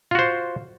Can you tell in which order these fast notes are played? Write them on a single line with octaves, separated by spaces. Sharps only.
F4 F#4 C5